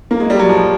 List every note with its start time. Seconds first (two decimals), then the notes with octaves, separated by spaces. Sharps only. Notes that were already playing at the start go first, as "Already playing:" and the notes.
0.11 A#3
0.20 G#3
0.30 G3
0.39 F#3
0.49 F3